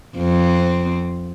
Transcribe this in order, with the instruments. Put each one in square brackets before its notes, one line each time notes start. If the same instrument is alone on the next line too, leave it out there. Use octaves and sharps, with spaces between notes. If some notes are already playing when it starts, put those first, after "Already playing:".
[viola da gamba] F2 C4